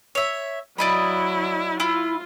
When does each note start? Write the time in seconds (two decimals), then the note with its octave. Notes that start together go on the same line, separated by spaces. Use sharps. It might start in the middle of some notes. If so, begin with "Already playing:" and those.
0.15 C#5 E5
0.78 F#3 E4 D5 D#5 B5
1.80 E4 F4